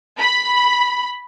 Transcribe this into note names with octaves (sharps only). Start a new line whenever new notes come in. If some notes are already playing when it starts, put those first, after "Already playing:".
B5